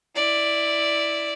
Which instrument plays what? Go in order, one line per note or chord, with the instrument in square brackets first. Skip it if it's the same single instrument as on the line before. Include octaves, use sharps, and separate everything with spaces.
[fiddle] E4 D5